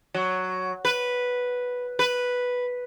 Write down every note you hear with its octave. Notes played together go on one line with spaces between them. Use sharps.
F#3
B4
B4